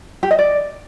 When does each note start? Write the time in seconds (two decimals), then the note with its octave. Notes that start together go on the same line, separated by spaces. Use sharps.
0.23 G4
0.31 D#5
0.39 D5